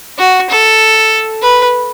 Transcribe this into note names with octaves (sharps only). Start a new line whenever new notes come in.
F#4
A4
B4